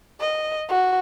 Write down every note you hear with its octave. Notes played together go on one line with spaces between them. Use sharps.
D#5
F#4